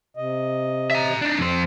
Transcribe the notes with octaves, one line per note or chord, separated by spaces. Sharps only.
C3 D#5
E5 A#5
D4 D#4
F2 C5